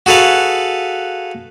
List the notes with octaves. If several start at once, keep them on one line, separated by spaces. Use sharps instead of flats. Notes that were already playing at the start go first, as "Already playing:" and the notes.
F#4 G#4 A4 B4 F5